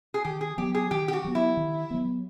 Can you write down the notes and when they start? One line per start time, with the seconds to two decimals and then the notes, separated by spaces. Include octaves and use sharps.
0.14 G#4
0.25 D#3 G4
0.41 G#4
0.58 F#3 B3 G4
0.75 G#4
0.91 D#3 G4
1.08 G4
1.13 F#4
1.24 F#3 B3
1.35 E4
1.57 D#3
1.91 F#3 B3